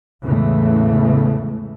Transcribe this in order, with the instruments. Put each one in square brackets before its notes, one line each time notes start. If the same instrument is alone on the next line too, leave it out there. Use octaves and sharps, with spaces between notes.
[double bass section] E2 A2 C#3 E3 G#3 A3